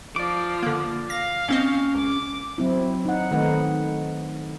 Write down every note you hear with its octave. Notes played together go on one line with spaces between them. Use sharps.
F3 D5 D6
D3 A#3
F5 A#6
A#3 C4 C#4 D#5
C#2 D6
F#3 C4 E4
D#4 F#5
D#3 A3 C4 D#4 B4 F#5